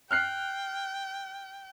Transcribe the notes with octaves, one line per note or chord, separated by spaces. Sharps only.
G5 F6 F#6 C7